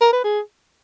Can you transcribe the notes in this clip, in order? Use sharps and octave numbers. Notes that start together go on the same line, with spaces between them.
A#4
B4
G#4